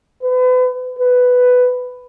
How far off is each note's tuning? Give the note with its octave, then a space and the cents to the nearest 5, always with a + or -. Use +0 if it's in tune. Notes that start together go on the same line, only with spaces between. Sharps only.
B4 +35
B4 +10